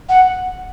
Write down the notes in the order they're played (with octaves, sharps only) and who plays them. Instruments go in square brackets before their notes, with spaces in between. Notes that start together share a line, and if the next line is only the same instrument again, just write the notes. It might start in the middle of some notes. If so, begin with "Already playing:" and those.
[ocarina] F#5